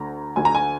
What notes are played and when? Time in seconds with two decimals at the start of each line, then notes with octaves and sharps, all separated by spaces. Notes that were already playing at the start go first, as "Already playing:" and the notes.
Already playing: D2 D3 A#5
0.36 D2 D3 G#5
0.45 A#5
0.55 G#5